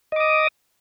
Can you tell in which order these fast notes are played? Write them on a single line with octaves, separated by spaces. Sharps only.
D#5 D6 D#6